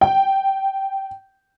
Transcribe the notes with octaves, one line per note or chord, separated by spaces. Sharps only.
G5